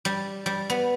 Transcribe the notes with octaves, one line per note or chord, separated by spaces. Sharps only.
G3
G3
B3